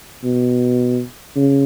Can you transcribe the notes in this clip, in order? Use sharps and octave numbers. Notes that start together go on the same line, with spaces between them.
B2
C#3